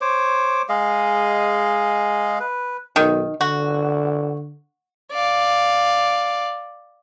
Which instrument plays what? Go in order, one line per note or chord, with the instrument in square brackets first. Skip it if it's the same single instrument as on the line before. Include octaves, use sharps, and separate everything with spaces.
[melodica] C5 C#5 D6
G#3 G#4 D#5 F5
B4
[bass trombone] B1 [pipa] D#3
[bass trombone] D3 [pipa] F#4
[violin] D5 F5